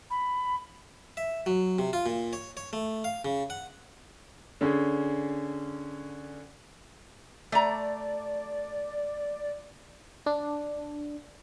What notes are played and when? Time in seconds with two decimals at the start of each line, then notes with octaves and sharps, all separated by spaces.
0.10 B5
1.17 E5
1.46 F#3
1.79 C3
1.93 F4
2.06 A#2
2.33 C#5
2.57 C#5
2.73 A3
3.04 F5
3.25 C#3
3.50 F#5
4.61 D3 C#4 G#4
7.52 A3 D5 A#5
10.26 D4